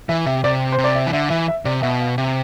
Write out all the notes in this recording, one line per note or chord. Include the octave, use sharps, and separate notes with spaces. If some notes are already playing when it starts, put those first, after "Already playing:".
E3 E5
C3 E5
C3 D5
C5
C3
D5
E5
E3
D3 E5
E3 E5
E5
C3 D5
B2 E5
F5
C3 E5